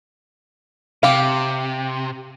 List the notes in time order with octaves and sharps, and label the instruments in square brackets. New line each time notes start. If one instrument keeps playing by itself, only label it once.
[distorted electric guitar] C3 [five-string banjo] G4 F5